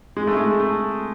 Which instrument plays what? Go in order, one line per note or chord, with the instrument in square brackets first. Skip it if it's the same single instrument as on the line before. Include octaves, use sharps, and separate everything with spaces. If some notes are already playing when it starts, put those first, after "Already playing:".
[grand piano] G#3
A3
G#3
A3